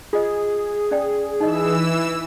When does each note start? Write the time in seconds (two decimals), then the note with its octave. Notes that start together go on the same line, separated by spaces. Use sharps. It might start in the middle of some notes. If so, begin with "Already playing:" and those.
0.13 F4 G#4 D#5
0.91 C#4 D5 G5
1.40 E3 D#4 D#5 E6